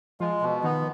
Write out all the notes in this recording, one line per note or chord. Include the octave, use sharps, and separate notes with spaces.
F3 G#3 F4
B2
D#3 B3 D#4